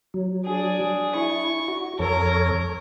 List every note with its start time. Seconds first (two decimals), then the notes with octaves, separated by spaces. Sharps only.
0.14 F#3
0.45 D4 G#4
1.15 E4 C#6
1.68 F#4
1.99 F2 A4 A#4 C#5